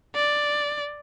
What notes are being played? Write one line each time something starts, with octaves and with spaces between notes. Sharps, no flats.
D5